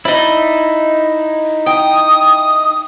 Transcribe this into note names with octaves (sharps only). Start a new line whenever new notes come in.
D#4 E4 D5 D#5
G5 D#6